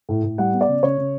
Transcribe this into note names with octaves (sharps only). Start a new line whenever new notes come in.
A2
A2
G3 F#5
B3
D5
C#3
C#3 C#5
C#3